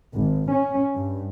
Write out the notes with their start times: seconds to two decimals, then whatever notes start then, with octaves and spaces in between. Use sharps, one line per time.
0.15 G#1
0.52 C#4
0.97 G2